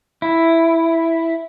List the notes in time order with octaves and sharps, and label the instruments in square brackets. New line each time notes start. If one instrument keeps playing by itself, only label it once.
[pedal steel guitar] E4